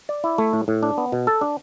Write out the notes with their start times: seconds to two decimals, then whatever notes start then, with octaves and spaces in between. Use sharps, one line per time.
0.09 D5
0.24 E4
0.38 A3
0.53 A2
0.68 A2
0.83 D4
0.98 B3
1.12 B2
1.27 A4
1.41 D4